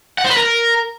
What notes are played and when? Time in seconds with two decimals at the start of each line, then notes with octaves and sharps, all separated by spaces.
0.18 F#5
0.24 C5
0.31 B4
0.37 A#4